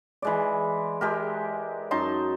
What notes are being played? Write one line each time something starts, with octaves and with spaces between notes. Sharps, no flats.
E3 G#3 D5
G#3 G4 A#4
F#2 D#4 A5 C6